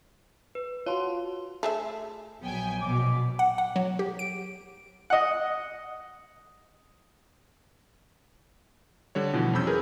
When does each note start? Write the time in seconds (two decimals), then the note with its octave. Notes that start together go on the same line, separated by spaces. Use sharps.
0.55 B4
0.86 F4 F#4 C#5 A5 C6
1.63 A3 G#4 E5
2.41 A#1 F#3 B3 G5 G#5
2.82 B2 D6
3.39 F#5
3.58 F#5
3.76 F#3
3.99 G4
4.19 D7
5.10 D#5 F#5
9.15 D3 G3 C#5
9.33 B2 E3 F3
9.53 F2 C3 C#4 B5 E6 G6
9.67 G#4 A#4 B4